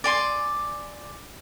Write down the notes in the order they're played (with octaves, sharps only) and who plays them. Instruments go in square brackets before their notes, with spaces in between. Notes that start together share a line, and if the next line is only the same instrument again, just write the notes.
[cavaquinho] D5 G#5 C6